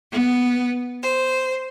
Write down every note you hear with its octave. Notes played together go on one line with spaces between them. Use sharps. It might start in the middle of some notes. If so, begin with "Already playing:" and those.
B3
C5